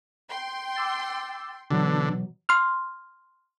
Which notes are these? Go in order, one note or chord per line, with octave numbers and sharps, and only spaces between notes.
G5 C6
D6 E6 A6
B2 D3 E3 F#3
C6 F6